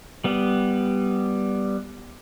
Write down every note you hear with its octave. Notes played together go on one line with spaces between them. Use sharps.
G3 B3